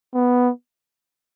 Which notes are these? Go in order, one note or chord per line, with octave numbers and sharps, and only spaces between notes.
B3